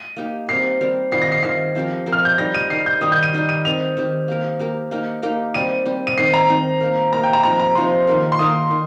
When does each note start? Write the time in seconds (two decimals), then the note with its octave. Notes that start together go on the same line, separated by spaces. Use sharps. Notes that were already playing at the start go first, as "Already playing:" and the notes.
Already playing: D#7
0.16 A#3 D#4 G4
0.48 G3 C4 G4 A#4 C7
0.81 G3 C4 G4 A#4
1.12 D#3 G3 C4 F4 C7
1.22 A#6
1.32 C7
1.43 D#3 G3 C4 F4 C7
1.75 F3 C4 G4 A#4
2.06 F3 C4 G4 A#4
2.12 F6
2.25 G6
2.38 G3 D#4 A#4 A#6
2.54 D#7
2.70 G3 D#4 A#4 C7
2.86 G6
3.01 D#3 G3 D#4 G4 D#6
3.12 G6
3.23 D#7
3.33 D#3 G3 D#4 G4
3.49 D#7
3.65 D#3 C4 G4 F7
3.97 D#3 C4 G4
4.28 A#3 G4 A#4
4.59 A#3 G4 A#4
4.91 A#3 D#4 G4 A#4
5.22 A#3 D#4 G4 A#4
5.54 G3 C4 G4 D#7
5.85 G3 C4 G4
6.07 D#7
6.18 D#3 C4 D#4 C7
6.34 A#5
6.49 D#3 C4 D#4
6.80 A#3 G4 A#4
7.12 A#3 G4 A#4 A#5
7.23 G5
7.33 A#5
7.43 C3 F3 D#4 A#5
7.60 A#5
7.75 C3 F3 D#4 C6
8.07 D#3 A#3 D#4 A#4
8.32 C6
8.39 D#3 A#3 D#4 A#4 D#6
8.71 D#3